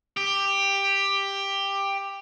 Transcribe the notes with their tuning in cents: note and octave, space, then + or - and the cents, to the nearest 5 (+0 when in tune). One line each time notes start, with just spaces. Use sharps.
G4 +10